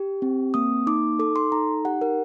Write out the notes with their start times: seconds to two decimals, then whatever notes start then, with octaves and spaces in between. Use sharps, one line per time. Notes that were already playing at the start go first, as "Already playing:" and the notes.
Already playing: G4
0.22 C4
0.54 A#3 D#6
0.87 D#4 D6
1.19 A4 D6
1.36 C6
1.52 D#4 A#5
1.85 G4 F#5
2.01 A#4